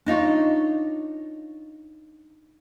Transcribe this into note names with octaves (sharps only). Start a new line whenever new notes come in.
D4 D#4 F4 C#5